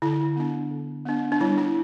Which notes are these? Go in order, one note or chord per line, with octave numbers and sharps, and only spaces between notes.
D3 E4
B3 D4
D3
B3 D4
D4
G3 E4
E4